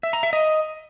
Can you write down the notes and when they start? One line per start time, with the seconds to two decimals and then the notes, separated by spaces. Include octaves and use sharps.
0.03 E5
0.13 A#5
0.23 E5
0.33 D#5